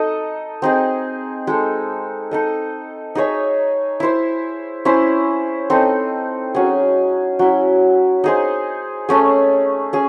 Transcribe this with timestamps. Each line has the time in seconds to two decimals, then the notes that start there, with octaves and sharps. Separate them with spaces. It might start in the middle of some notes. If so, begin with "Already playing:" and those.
Already playing: D#4 A4 D#5
0.62 C4 D#4 G#4
1.47 G#3 D#4 A4
2.31 D#4 A4 D#5
3.15 D#4 G#4 C#5 E5
4.00 E4 C5 E5
4.85 C#4 E4 C5
5.70 C4 D#4 A4
6.55 F#3 C#4 G#4
7.39 F#3 C#4 E4
8.24 D#4 G#4 C5
9.09 A3 C#4 G#4
9.93 C#4 G#4